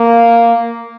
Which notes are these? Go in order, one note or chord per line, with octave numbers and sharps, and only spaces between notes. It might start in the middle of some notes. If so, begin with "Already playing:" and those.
Already playing: A#3